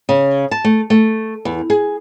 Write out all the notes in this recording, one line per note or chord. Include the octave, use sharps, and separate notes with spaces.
C#3
A5
A3
A3
E2
G#4